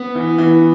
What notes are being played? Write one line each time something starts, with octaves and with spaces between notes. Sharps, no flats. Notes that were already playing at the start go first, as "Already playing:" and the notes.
Already playing: B3
E3
E3